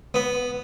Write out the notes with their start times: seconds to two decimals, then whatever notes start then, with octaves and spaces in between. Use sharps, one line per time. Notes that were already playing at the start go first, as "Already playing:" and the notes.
0.14 B3